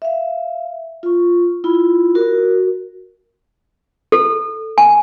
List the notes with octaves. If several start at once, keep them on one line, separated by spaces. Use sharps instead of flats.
E5 F5
F4 C#6
E4 F4 B5
F#4 A#4
A4
G#5